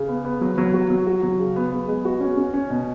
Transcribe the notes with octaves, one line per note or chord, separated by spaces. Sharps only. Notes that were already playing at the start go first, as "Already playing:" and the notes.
Already playing: C#3
B3
B3
F#3
F#3
F#4
F#3
F#4
F#3
C#3
B3
B3
G#3
F#4
C#4
C#4
C#4
B2